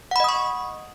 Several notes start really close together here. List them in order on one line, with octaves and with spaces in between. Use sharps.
F#5 B5 D#5 D#6 C#6